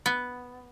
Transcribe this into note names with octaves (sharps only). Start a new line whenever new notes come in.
B3